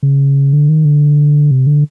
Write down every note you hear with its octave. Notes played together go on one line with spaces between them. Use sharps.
C#3
D3
D#3
D3
C3
D3